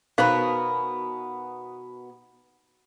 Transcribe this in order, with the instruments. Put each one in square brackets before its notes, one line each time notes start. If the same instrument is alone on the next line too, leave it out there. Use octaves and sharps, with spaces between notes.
[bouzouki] B2 B3 A#4 [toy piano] D#4 C5 F5